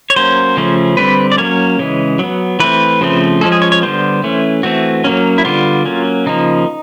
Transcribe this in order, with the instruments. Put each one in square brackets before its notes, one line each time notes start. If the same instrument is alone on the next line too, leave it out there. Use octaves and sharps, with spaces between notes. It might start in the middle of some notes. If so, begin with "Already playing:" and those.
[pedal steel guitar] C#5
F#3 A#3 C#4 C5
C#3 F3 A3 C#4
D3 G3 C4 B4
D5
F#3 A#3 C#4 C#5
C#3 E3 G#3
F#3 B3
E3 A3 C4 B4
C#3 F3 A3 C4
F3 G#3 C#4 A4
G#4
C#5
C#5
D3 G3 B3 C5
E3 A3 C#4
E3 A3 C4 F#4
F#3 A#3 C#4
E4
D3 G3 B3 F4
F#3 A#3 C#4
C#3 F3 A#3 D#4